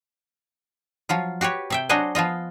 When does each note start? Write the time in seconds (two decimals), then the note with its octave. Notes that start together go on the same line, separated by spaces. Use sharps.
1.09 F3 F#3 F4
1.41 F#4 G4 B4 C#5
1.70 C3 E5 G5
1.89 F#3 D4 F#4 C5 D#5 G#5
2.15 F3 B3 F4 D#5